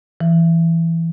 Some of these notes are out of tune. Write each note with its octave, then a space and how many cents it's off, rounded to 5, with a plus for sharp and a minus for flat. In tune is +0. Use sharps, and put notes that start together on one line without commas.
E3 +5